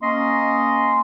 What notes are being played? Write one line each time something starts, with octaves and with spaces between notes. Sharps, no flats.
A#3 C#4 D#5 C6